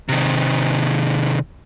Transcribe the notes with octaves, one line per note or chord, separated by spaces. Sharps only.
C3 D#3